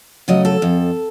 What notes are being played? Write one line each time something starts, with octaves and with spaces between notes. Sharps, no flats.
C#3 F#3 A3 D#5
A4
F2